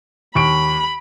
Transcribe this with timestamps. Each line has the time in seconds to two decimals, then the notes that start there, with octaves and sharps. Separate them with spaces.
0.35 D#2 B5 C#6 D7